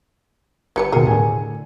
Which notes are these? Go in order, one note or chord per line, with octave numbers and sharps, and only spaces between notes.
G1 E3 A#3 B3 G4 C#7
D#2 B2 G#4 A#4
A2 D3 G#5